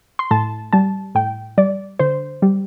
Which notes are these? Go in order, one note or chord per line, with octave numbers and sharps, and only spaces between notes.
C6
A2 A5
G3 A5
A2 G5
G3 D5
D3 C5
G3